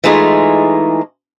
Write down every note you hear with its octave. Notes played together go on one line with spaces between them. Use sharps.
E3 G#3 A3 D#4 F4 G#4